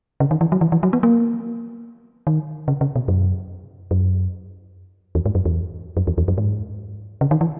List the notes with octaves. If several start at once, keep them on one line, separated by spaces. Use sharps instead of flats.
C#3
D#3
E3
F#3
E3
E3
F#3
B3
A#3
D#3
C#3
C#3
B2
F#2
F#2
E2
G#2
F#2
E2
F#2
E2
E2
F#2
G#2
C#3
D#3
E3